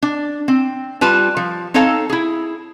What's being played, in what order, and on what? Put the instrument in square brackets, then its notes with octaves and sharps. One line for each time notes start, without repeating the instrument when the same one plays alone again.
[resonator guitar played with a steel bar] D4
C4
G3 F4 B4 A5
F3
C4 D#4 A4 C#5 F5 A5
E4 G#4